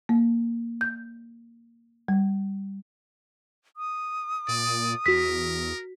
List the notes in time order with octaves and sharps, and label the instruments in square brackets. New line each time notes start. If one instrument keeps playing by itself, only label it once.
[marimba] A#3
G6
G3
[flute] D#6
[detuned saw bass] A#2 [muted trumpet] D5
[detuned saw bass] E2 [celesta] F#4 B6 [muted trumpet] A#4